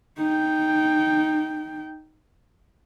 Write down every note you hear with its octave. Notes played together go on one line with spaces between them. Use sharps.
D#4 G5